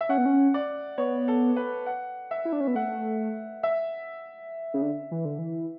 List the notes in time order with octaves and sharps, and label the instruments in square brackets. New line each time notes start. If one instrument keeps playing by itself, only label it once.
[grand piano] E5
[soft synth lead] C#4 [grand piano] F#5
[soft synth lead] B3
C#4
[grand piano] D5
[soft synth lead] B3 [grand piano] C#5
[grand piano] A4
B4
F#5
E5
[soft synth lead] E4
D4
C#4
B3
[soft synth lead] A3 [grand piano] F#5
[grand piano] E5
[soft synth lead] C#3
D3
E3
D3
E3